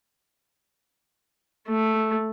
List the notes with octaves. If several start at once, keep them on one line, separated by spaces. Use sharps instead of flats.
A3